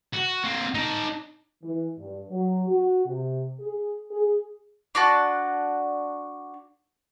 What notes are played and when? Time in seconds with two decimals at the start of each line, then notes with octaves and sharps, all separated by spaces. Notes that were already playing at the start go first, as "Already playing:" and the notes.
0.13 F#4
0.43 A#3 C4
0.74 D#4 A5
1.64 E3
1.98 G2
2.30 F#3
2.68 F#4
3.06 C3
3.60 G#4
4.11 G#4
4.95 D4 F#4 A5